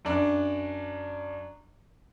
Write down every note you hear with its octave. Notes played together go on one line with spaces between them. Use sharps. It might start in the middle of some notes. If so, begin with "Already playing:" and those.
F#2 D4